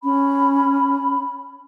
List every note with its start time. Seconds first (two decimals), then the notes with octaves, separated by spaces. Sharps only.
0.03 C#4 B5